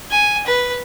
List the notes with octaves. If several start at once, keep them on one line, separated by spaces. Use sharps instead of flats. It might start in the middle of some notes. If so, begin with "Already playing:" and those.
G#5
B4